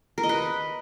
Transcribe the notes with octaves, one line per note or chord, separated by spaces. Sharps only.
A#4
D#5
B4